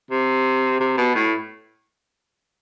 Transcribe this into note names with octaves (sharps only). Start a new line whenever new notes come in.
C3
C3
B2
A2